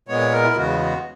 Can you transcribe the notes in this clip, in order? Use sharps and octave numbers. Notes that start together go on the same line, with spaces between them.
A#2 G#3 B3 C#5
A#4
E4
E2 C#3 G#3 B3 F#4
F#4